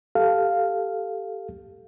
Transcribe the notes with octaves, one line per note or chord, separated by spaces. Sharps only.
G4 A4 F5